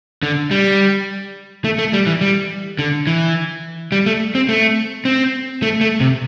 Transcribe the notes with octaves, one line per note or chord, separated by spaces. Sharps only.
D3
G3
A3
A3
G3
E3
G3
D3
E3
G3
A3
C4
A3
C4
A3
A3
C3